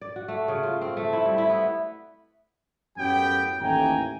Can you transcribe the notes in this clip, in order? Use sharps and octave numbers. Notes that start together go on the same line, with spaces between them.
D5
F#4
A3
C#3
F4
C4
A3
E4
G3
E4
B3
F#2 A2 F#3 B3 G4 G5
A1 D#2 A3 G5 G#5 A#5